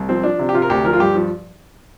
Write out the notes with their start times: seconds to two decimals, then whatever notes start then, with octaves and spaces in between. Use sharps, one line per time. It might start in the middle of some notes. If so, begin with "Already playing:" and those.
Already playing: C2
0.09 F3 C4
0.23 F3 D4
0.39 C3
0.49 G4
0.54 C3 F4
0.62 A#4
0.70 D2 G4
0.85 F3 A#4
0.93 F4
1.00 G2 G4
1.16 F3